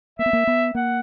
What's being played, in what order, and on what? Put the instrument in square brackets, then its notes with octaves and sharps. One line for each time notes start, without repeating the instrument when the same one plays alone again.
[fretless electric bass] A#3 [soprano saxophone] E5
[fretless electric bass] B3
A#3
B3
[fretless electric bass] A#3 [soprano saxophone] F#5